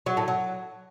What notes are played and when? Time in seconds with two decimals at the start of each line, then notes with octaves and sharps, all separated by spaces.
0.06 F#3
0.17 A2
0.28 F#3